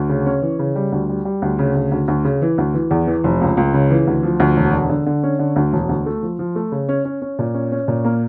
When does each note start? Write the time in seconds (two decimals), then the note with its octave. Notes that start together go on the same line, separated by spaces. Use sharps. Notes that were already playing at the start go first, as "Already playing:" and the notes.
Already playing: D2
0.09 C#3
0.26 C#4
0.42 E3
0.59 C#3
0.76 G3
0.92 D2
1.09 G3
1.25 G3
1.42 D2
1.59 C#3
1.75 D2
1.91 D2
2.08 D2
2.25 C#3
2.42 E3
2.58 D2
2.74 E3
2.91 E2
3.07 E3
3.24 F1
3.41 C#2
3.57 C#2
3.74 C#3
3.90 E3
4.07 D2
4.23 F3
4.40 D2
4.56 E1
4.73 D3
4.89 D3
5.06 D3
5.23 C#4
5.39 D3
5.56 D2
5.73 E1
5.89 D2
6.06 A3
6.23 F3
6.39 F3
6.56 A3
6.72 C#3
6.89 C#4
7.05 C#4
7.22 C#4
7.39 A#2
7.54 C#4
7.72 C#4
7.88 A#2
8.05 A#3